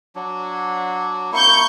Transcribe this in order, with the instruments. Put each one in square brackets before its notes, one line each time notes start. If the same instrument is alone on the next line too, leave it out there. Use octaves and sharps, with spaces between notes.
[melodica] F#3 D4
[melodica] A#3 E4 [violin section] C#6 G6